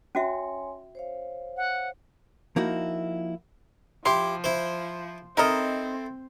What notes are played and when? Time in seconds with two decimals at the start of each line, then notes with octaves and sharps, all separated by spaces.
0.15 C#4 F#4 C#5 E5 G#5 C6
0.95 C5 C#5 F5
1.57 F#5
2.56 F3 A#3 D#4 E4 F#4
4.06 F3 E4 G4 C6
4.44 E4 C5
5.37 C4 D#4 E4 A4 A#4 D#5